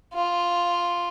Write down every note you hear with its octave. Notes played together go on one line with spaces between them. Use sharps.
F4